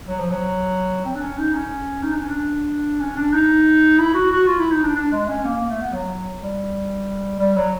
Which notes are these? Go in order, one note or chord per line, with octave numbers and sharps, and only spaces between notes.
F#3
F3
F#3
C4
D4
C#4
D#4
C#4
D#4
D4
C#4
D4
C#4
D4
D#4
E4
F#4
F#4
F4
E4
D#4
D4
D4
G#3
C#4
A#3
A#3
A3
B3
F#3
G3
G3
F#3